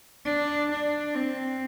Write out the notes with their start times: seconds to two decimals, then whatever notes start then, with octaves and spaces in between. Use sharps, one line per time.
0.25 D4
0.70 D4
1.14 C4